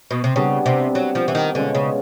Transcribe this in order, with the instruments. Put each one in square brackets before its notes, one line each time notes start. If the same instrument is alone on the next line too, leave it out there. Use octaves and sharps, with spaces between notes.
[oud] B2
C3
[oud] C#3 [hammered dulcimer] G3 B3 D4 F#4
[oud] C3
F#3
F3
E3
D#3
[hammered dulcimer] B2 G#3 C#4 F4 [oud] D3
[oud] C#3